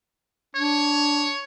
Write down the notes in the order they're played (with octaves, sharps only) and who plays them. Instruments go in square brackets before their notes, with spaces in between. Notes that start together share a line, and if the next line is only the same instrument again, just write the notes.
[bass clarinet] D4 [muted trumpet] C#5